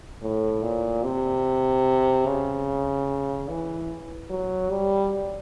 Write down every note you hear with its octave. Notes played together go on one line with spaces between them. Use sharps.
A2
A#2
C3
C#3
E3
F#3
G3